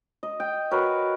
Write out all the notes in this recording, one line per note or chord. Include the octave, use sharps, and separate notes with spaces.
D#5
G5
F#4 A#4 B4 C#5